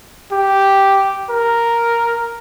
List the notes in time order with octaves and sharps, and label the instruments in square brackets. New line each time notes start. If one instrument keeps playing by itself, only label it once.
[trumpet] G4
A#4